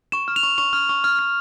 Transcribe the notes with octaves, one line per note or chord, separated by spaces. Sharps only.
C#6 E7
F6
F7
C#6
C#6 F7
F6
C#6
F6
F6